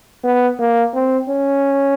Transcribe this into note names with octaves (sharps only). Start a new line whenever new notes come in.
B3
A#3
C4
C#4